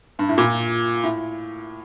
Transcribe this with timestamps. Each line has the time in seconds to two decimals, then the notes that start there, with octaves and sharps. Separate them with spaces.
0.19 G2
0.29 A2
0.38 A#2
1.03 A2